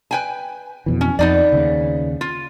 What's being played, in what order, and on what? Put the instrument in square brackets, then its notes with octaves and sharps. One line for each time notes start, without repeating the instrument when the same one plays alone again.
[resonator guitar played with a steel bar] B4 G5 G#5
[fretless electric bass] F2 B2 E3
[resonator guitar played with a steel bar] C#4
[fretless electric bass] F2 [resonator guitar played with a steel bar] B3 D#4 D5
[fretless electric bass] D#2 C#3
[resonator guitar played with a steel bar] F4